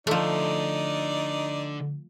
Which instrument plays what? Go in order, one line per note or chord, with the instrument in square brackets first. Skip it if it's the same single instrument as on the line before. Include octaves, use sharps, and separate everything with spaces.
[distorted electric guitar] D3 C6 [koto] F3 A3 [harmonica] D#4 D5